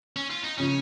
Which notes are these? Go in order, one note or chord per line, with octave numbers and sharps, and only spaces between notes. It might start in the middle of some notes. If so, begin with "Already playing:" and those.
C#4
F4
D#4
C#3 F3 C#4